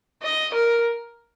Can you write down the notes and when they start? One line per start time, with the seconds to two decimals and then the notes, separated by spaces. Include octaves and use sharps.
0.23 D#5
0.54 A#4